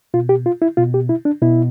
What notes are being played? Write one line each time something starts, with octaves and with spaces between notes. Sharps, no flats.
B2 F4
G4
F4
E4
B2 F4
G4
E4
D4
B2 E4